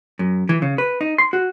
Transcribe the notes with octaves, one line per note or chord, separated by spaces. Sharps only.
F#2
E3
C#3
B4
D#4
C6
F#4